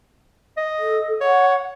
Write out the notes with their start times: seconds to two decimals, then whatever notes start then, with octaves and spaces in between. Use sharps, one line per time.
0.57 D#5
0.79 A4
1.21 C#5 F#5